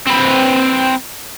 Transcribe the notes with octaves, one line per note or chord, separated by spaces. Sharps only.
C4 B4